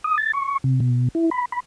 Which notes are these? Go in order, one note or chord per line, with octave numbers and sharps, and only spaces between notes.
D#6
A6
C#6
C3
B2
E4
B5
B5